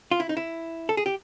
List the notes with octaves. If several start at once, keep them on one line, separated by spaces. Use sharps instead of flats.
F4
E4
D#4
E4
A4
G#4
G4